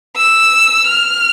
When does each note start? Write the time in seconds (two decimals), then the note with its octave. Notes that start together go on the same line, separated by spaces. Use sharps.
0.17 E6
0.87 F6